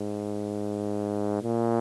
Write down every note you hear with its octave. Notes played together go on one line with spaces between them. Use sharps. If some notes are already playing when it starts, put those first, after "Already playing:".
Already playing: G#2
A#2